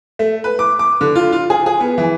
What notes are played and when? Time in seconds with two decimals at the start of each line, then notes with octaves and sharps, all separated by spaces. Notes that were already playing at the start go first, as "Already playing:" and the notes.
0.19 A3
0.44 B4
0.59 D6
0.79 D6
1.01 D3
1.16 F4
1.33 F4
1.50 G#4
1.66 G#4
1.80 B3
1.98 E3